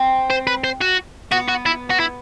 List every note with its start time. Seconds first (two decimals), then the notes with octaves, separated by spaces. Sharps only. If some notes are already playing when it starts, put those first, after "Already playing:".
Already playing: C4
0.30 C5
0.47 B4
0.64 C5
0.81 F#4
1.31 B3 F#4
1.49 F#4
1.66 E4
1.90 F#4
2.00 E4